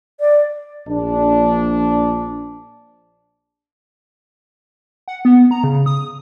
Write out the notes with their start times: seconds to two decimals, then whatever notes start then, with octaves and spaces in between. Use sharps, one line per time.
0.20 D5
0.88 A#1 D4
5.08 F#5
5.25 B3
5.51 A#5
5.64 C#3
5.86 D#6